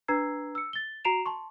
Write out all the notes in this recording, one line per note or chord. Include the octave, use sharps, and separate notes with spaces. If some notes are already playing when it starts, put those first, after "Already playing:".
D4 B4 A#5 E6 G#6 C7
E6 C#7
A6 G7
F#4 A#5 C7 D7 E7 F7
A5 C6 C#6